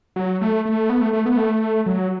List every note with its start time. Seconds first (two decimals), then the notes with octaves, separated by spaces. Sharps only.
0.16 F#3
0.41 A3
0.65 A3
0.90 B3
1.01 A3
1.13 A3
1.26 B3
1.37 A3
1.86 F#3